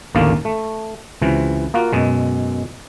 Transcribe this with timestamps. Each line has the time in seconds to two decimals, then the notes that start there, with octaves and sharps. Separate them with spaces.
0.15 A1 D#2 D3 A#3 D5 F5
0.45 A3
1.21 C#2 C3 E3
1.74 A#3 F4 F#4
1.93 F#2 B2 G#3